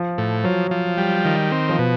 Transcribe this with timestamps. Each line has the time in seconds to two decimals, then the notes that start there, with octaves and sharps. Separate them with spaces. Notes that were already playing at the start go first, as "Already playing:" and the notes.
Already playing: F3
0.18 A2
0.44 F3 F#3
0.71 F3
0.98 G3
1.25 D#3
1.52 C4
1.69 F3
1.79 B2